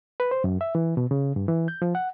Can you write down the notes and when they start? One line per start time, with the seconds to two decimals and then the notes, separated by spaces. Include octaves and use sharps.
0.20 B4
0.31 C5
0.44 F#2
0.61 E5
0.75 E3
0.97 B2
1.11 C#3
1.36 G2
1.48 E3
1.68 G6
1.82 F3
1.95 F#5